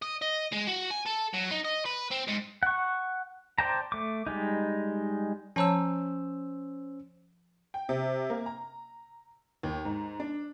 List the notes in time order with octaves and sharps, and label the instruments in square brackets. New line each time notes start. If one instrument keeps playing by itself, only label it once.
[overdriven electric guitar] D#5
D#5
G#3
F#4
G#5
A4
F#3
D#4
D#5
B4
C4
G#2
[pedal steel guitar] F#5 C#6
C5 D5 G5 A5 A#5
A3 D6
G3 G#3 D#4
[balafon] F3 A5 A#5 [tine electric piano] C#4 C5 E6
[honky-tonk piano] G5
C3
A#3
A#5
D#2
G#2
D4